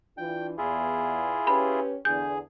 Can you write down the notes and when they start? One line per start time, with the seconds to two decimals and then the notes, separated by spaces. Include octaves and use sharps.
0.17 E3 D4 F4 G5
0.58 E2 E4 F4 G#4
1.47 C#4 G4 B4 B5
2.05 E2 D3 D4 G#4 G6